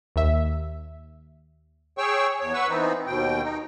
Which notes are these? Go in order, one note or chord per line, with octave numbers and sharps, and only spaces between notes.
D#2 E5
G#4 C#5 G5 C#6 E6
E2 C#5
B4 F#5 C#6 E6
E3 B3 C4 D#4
D#2 B2 G5
D#4